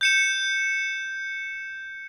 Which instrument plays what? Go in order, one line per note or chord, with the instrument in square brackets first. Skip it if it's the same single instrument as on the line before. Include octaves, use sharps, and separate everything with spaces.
[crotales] G6 C#7 E7